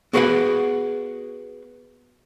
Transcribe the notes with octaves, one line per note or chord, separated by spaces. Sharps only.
B3 F#4 G#4 B4 F5 F#5